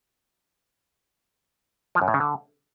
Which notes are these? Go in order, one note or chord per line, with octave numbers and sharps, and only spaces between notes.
F3
F#2
A2
C#3
D3